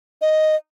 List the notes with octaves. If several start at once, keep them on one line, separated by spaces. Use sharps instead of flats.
D#5